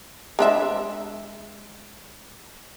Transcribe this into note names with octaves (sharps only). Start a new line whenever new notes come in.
G#3 D4 E5